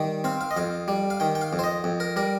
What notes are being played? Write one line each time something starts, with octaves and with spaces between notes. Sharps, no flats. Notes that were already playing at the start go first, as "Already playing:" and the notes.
Already playing: D#3 G3
C4 F5
F5
D#5
F2 F5
G3
F5
D#3 G5
G5
F5
F2
C5
D#5
F2
A#4
G3 A#4